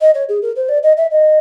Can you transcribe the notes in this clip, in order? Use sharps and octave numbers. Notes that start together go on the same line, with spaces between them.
D#5
C#5
G#4
A#4
C5
D5
D#5
E5
D#5